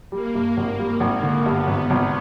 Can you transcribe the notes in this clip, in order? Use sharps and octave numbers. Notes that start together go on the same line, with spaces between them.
G3 A#3
G2
G#1
G3 A#3
G#1
D3
G2 B3
G#1
G#1